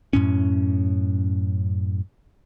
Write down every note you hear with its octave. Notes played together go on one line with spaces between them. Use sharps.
F#2 A2 C#4